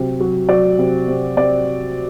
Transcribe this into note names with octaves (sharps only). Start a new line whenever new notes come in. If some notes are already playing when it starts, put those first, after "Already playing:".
Already playing: C3 F#3
F#3
F#3 D5
C3
C3
C3 D5